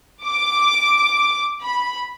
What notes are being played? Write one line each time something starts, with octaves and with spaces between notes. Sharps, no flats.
D6
B5